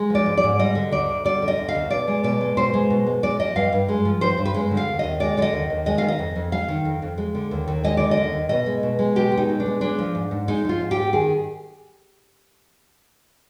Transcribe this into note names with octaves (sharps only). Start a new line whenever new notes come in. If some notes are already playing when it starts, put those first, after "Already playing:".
Already playing: G#3
F3 D5
G#2
D5
G#2
G3 D#5
D3
D2 D5
D2
G3 D5
D3
D#5
D2
F5
D2
B2 D5
G#3
B2 D5
G#3
B2 C5
G#3
B2
G#3
G#3 D5
F3 D#5
G2 F5
G2
G#3
F3
G2 C5
G2
B4
G#3 C5
D3
F5
D#2
D#2 D#5
G#3 D5
D3 D5 D#5
D#2
D#2
G#3 D#5
D#3 F5
D#5
F2
F2
G#3 F5
D#3
F2
F2
G#3
D3
D#2
D#2
G#3 D#5
D3 D5
D#5
D#2
D#2
B2 D#5
G#3
B2
G#3
B2 G4
G#3
D#4
B2
D4
G#3
G#3 D4
F3
G#2
G#2
G#3 D#4
F3 F4
G#2
G4
G#2
D#3 G#4